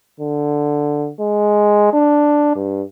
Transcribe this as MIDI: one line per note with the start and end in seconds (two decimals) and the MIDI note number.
0.20 1.10 50
1.20 1.89 56
1.93 2.54 62
2.56 2.82 43